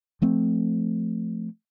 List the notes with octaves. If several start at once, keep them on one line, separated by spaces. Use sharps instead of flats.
F3 A3 C4